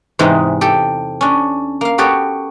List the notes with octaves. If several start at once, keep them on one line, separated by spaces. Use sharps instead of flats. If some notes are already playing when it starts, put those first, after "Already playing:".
E2 G#2 C3 G#3 D#4 B4
G4 A4
C#4 D4
A#3 F5
B3 F#4 G4 A4 B4 C#5